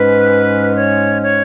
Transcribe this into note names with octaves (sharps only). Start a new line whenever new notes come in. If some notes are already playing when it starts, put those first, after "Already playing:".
Already playing: G#2 G#3 C#4 B4
C#5
C#5